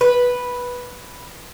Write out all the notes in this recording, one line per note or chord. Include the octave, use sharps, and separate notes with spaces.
B4